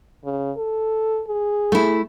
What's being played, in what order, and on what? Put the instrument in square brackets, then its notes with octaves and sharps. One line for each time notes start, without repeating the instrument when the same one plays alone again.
[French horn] C#3
A4
G#4
[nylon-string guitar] A3 E4